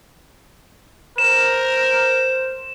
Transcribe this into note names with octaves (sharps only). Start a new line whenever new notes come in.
A#4 C5 E7